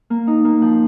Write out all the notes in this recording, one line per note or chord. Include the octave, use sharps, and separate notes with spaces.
A#3
D#4
A#3
F3